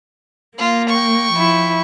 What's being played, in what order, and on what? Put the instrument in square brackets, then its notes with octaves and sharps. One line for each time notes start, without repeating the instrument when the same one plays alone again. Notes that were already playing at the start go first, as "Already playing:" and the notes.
[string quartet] A#3 [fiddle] F4
[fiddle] G5 C#6
[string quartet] F3 E4